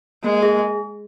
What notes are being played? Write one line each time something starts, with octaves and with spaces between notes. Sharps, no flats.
G#3 A#3
G#4